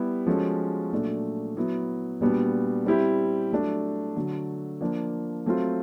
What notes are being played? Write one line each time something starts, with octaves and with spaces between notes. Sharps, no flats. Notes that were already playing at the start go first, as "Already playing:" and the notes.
Already playing: G3 B3 E4 G4
F3 G#3 C#4 F#4 A4
A#2 F#3 A3 D4
F#3 B3 E4
A#2 G3 B3 D4 F#4
G3 C4 E4 G4
F#3 A3 D4
D3 F#3 A3
F3 A#3 D4
F#3 A3 C4 F4